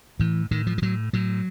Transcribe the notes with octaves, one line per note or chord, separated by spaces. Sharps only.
A2 E3
A2 D#3
F3
F3
A2 F#3
A2 F#3